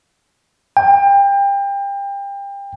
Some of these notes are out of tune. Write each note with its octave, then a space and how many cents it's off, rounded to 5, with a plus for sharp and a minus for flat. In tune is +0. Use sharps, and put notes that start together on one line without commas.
G5 +30